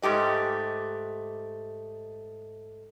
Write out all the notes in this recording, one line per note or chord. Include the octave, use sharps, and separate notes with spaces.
G#2 A3 G4 D#5